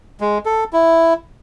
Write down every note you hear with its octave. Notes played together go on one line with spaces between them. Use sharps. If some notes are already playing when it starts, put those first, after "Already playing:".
G#3
A4
E4